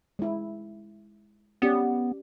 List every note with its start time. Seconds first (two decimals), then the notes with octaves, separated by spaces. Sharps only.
0.19 G#3 E4
1.62 B3 C#4 G4 D5